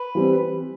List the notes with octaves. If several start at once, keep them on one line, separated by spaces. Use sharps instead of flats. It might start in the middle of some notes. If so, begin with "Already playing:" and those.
Already playing: B4
E3 G3 C4